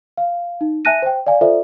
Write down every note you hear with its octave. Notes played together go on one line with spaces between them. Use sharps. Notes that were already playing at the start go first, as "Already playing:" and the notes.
F5
D#4
E5 G#5 A5 F#6 A#6 D#7
C5 G5
D5 F5 G#5
F4 A4 C5 D5 E5